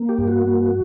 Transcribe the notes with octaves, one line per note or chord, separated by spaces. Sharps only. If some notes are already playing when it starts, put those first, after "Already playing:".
Already playing: A#3
G4
G2
F#4
A#3